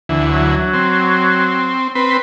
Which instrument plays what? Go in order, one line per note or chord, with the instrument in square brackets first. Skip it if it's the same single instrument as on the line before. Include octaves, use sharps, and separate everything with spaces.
[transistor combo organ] D2 E3
[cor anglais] F#3
[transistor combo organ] C4
C4 B4